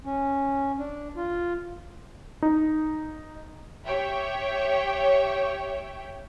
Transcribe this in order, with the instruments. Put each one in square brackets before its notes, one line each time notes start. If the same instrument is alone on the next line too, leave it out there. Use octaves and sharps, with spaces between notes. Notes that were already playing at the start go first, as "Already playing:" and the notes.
[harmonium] C#4
D4
F4
[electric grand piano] D#4
[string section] G4 C#5 E5 G5